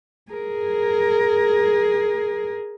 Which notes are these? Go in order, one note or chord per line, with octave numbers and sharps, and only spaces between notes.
G#4 A#4